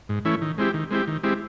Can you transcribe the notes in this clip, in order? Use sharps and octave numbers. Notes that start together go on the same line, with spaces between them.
G#2
E3 A3 C#4 E4
D#3
G#3 C4 E4 G4
D#3
G#3 C4 E4 G4
D#3
G#3 C4 E4 G4